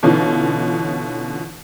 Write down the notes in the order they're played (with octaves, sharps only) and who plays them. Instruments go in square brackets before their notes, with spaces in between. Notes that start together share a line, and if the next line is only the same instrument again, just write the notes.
[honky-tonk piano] B2 D3 E3 C#4 D#4 F4